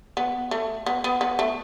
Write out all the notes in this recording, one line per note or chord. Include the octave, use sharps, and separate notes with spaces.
B3
A3
B3
B3
B3
A3